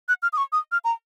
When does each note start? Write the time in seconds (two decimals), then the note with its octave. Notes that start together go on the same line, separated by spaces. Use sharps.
0.09 F#6
0.23 F6
0.33 D#6
0.37 C#6
0.52 D#6
0.72 F6
0.85 A#5